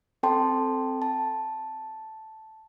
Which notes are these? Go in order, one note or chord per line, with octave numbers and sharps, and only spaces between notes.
C4 A4 G5 A5 C6
A5